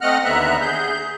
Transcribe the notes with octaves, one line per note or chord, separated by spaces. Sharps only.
A3 C4 D#5 F#5 F6 F#6
D#2 D3 B3 E5 A#5 F#6
G#4 G6